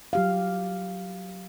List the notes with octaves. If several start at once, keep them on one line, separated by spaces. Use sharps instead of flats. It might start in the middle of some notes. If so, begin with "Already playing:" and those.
F#3 G4 F5